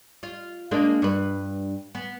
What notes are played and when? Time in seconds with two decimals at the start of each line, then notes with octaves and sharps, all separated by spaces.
0.23 F4 F5
0.71 G#3 A#3 D4
1.02 G2 B4
1.95 B3